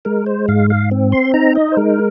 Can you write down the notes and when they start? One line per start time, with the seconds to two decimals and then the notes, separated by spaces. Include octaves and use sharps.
0.05 G#3 A#4
0.26 C5
0.48 G#2 F5
0.70 F5
0.91 C4
1.12 C6
1.34 D#4 A#5
1.55 D#5
1.72 C5
1.77 G#3 A#4